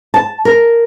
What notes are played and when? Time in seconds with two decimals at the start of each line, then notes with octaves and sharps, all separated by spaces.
0.14 A5
0.45 A#4